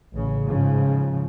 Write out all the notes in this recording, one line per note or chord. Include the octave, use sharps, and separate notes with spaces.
A1 C#3
G#2 C#3 F3